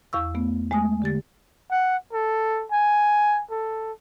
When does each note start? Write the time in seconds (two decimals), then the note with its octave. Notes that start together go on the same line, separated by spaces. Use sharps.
0.13 E2 F5 C#6 E6
0.35 A3 B3
0.71 G#3 A3 G#5 D#6
1.02 D3 G4 A6
1.71 F#5
2.13 A4
2.72 G#5
3.51 A4